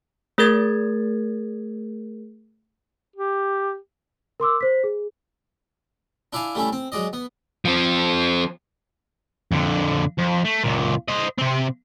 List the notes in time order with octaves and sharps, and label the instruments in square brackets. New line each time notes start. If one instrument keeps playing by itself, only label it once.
[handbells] A3 G#4 A#4 G#6 A6
[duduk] G4
[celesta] A#4 C6 D6 E6
C5 B6
G#4
[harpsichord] D4 E4 D5 F5 G#5
G3 A3 C#4 E4
C4
F#3 G#3 D5 D#5
B3
[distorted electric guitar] F3 C4
F2 D3
F2
A3
C#2 A#2
C5 D#5
C3 C4